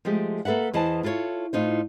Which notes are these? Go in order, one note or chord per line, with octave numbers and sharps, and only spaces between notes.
F3 G#3 A3 G4 G#4
A#3 A4 B4 E5 F#5
E2 E3 C5 D#5 A5
E4 F4 A4 A#4 C#5
A2 D#4 F4 C5